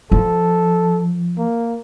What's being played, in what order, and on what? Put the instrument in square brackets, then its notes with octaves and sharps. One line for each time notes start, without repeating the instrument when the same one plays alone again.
[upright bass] F3 [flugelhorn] A4
[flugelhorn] A#3